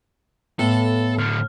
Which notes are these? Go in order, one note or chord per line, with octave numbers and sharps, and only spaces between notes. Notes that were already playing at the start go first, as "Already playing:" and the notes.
A2 B3 A4
A2 D3 F6